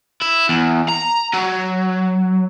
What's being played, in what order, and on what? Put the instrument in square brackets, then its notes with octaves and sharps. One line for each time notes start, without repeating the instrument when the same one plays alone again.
[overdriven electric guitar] E4
E2
A#5
F#3